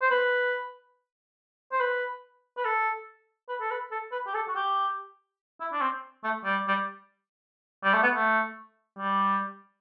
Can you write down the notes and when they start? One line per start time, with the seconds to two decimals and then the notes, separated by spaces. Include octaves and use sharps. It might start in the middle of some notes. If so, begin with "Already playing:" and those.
0.02 C5
0.11 B4
1.72 C5
1.80 B4
2.57 B4
2.65 A4
3.49 B4
3.61 A4
3.71 B4
3.92 A4
4.12 B4
4.27 G4
4.34 A4
4.49 F#4
4.56 G4
5.61 E4
5.73 D4
5.81 C4
6.24 A3
6.45 G3
6.68 G3
7.84 G3
7.94 A3
8.03 B3
8.14 A3
8.99 G3